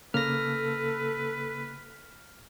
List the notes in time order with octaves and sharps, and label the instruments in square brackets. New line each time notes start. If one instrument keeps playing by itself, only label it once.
[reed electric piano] C#3 A#3 [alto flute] A4 [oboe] B4 [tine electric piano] F6 A#6